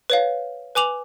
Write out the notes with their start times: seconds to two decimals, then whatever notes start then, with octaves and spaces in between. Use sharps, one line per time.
0.10 B4 C#5 F5
0.75 B4 G#5 D6 F7 F#7